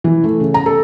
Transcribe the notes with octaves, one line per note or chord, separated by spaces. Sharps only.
E3
A3
C#3
A#5
A4